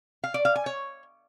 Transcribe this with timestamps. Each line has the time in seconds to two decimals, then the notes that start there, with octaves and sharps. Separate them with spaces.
0.24 F5
0.34 D5
0.45 F5
0.56 G#5
0.66 C#5